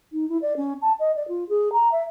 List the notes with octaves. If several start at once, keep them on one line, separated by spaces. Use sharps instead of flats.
D#4
E4
D5
C#4
A5
D#5
D5
F4
G#4
A#5
E5